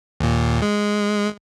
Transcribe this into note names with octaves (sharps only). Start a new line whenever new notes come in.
D#2 A#2
G#3